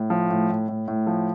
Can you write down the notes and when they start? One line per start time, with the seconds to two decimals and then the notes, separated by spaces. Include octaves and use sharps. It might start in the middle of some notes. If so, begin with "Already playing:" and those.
Already playing: A2
0.10 F3
0.30 A2
0.49 A2
0.68 A2
0.88 A2
1.07 F3